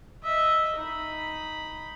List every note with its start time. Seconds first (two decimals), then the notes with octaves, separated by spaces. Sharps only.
0.23 D#5 E5
0.77 D#4 B5